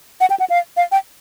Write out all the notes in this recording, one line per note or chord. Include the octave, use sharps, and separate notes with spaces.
F#5
G5
F#5
F5
F5
G5